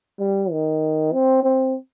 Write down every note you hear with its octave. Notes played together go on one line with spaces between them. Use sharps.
G3
D#3
C4
C4